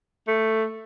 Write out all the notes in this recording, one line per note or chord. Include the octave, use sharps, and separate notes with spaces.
A3